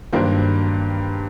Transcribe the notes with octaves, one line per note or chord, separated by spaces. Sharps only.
G2 D#3 F#3 A#3 D4 A#4 C5